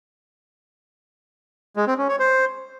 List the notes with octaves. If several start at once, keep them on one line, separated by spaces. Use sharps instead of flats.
G#3
C4
C#4
C#5
C5